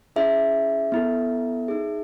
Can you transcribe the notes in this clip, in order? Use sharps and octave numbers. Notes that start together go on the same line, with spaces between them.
C#4 E4 G#4 E5
B3 E4 A4
D#4 G#4